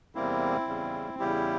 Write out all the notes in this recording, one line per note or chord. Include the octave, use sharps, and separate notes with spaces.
E2 C3 G3 A#3 C4 E4
E2 C#3 G3
E2 C#3 G3 E4 G4